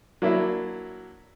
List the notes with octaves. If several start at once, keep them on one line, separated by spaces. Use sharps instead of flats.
F#3 A#3 D4 E4